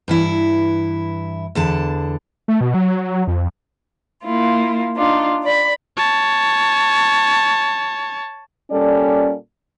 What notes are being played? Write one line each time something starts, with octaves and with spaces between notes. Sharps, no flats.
G2 E3 E4
E2 D3 A5
A3
B2
F#3
F2
A#3 E4 F4
D4 D#4 F4
D5 B5
C#5 A5
A#2 G3 C#4 A4 D5